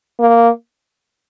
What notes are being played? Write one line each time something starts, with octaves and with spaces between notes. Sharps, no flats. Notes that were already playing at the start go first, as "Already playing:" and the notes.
A#3